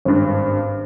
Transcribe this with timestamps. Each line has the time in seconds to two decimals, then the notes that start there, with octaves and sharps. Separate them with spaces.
0.05 G#1 G2